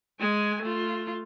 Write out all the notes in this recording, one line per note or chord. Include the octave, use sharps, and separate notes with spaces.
G#3 G#5
A3 F4